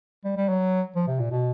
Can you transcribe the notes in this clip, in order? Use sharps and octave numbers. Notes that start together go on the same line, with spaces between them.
G3
G3
F#3
F3
C3
A#2
B2